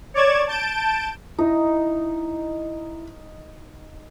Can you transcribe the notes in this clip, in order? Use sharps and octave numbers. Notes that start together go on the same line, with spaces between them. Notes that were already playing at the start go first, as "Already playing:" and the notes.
C#5 D5 D6 G#6 E7
A5 G6 D7 E7
D#4 E4